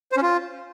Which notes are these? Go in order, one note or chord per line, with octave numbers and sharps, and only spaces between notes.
C5
C#4
F4